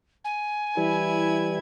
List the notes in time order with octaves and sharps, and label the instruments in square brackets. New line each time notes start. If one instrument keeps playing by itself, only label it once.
[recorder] G#5
[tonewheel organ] E3 G3 [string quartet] E4 G#6